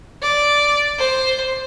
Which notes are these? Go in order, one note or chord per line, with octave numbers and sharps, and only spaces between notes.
D5
C5